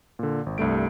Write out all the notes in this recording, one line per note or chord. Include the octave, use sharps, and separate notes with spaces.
A#2 D3
G#1
C2 G2 A3 D7